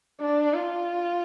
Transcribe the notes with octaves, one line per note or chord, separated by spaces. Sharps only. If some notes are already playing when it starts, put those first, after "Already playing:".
D4
F4